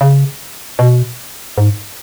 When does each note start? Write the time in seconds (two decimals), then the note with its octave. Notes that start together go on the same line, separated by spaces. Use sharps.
0.01 C#3
0.79 B2
1.58 G#2